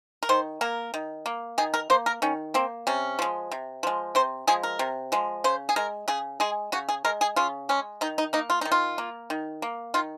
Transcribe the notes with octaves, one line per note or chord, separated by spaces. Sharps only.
A#4
D#3 C5
A#3 A#4
D#3
A#3
D#3 G#4
A#4
A#3 C5
A#4
D#3 C#4
A#3 C4
C3 C#4
F3 G#3
C3
F3 G#3
C3 C5
F3 G#3 G#4
A#4
C3
F3 G#3
C#3 C5
G#4
G#3 A#4
C#3 G#4
G#3 G#4
C#3 F#4
G#4
G#3 A#4
G#4
C#3 F4
G#3 C#4
D#3 D#4
D#4
A#3 D#4
F4
D#3 D#4
F4
A#3
D#3
A#3
D#3 F4